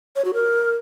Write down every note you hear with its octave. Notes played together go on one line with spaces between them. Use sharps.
C#5
F#4
A#4